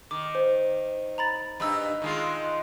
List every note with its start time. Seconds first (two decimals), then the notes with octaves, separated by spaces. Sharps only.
0.11 D#3 D6
0.35 C5
1.18 A#5 B5 A6
1.60 G2 D#4 B5 E6
2.02 D#3 G#3 F4